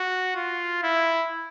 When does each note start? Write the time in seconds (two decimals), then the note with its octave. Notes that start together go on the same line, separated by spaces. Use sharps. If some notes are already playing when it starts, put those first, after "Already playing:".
Already playing: F#4
0.36 F4
0.83 E4